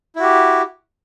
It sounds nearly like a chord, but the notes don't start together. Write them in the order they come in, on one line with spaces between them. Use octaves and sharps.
E4 F#4 G4